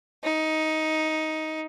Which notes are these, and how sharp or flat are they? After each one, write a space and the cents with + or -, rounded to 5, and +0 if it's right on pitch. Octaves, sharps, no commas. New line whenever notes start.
D#4 +10